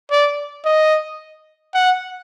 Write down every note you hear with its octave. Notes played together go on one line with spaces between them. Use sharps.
D5
D#5
F#5